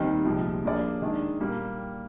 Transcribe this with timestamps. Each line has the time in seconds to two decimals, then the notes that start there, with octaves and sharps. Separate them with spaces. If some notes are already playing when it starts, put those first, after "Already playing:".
Already playing: D#2 D#3 G3 C4 D#4
0.25 C2 A#2 F3 G#3
0.63 F3 A#3 D4 G#4 D5
1.01 D#3 G#3 D4
1.40 A#2 G3 A#3